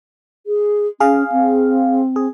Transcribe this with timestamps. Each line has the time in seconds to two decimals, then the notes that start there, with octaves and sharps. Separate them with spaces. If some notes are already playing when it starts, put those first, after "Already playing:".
0.47 G#4
1.00 C#4 G#4 F5
1.32 C4
2.16 G#4